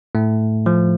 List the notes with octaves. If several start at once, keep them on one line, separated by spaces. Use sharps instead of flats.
A2 A3
F3